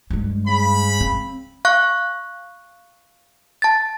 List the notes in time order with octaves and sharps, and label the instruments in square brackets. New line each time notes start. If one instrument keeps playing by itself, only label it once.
[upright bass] G2 G#3
[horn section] C#3 B5
[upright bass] C4
[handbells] F5 C#6 F#6
A5 A6